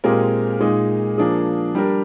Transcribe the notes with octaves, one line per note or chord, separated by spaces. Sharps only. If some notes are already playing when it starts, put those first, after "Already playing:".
A#2 G#3 C4 G4 A#4
A#2 G#3 D#4
F3 A#3 D4 G#4
G3 D4 G4 A#4